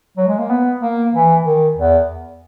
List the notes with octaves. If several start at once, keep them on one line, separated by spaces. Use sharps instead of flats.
F#3
G#3
A#3
B3
A#3
E3
D#3
E2